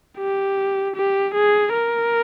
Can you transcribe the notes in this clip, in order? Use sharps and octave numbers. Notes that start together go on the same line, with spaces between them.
G4
G4
G#4
A#4